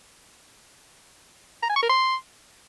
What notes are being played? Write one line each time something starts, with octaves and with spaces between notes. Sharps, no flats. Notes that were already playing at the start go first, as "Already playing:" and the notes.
A#5
G#5
C#6
A#4
C6